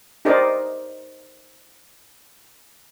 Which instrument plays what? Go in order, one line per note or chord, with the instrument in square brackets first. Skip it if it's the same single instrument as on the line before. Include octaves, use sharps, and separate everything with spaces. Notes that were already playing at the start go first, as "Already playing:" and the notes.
[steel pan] D#4 G4 A#4 C5 D5 D#5